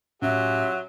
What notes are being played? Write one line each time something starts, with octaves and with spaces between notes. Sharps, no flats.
A2 F#3 C#4 F4 G4 E5